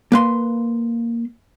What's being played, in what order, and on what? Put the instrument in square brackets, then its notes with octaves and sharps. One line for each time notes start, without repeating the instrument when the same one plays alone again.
[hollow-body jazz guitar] A#3 B4 C6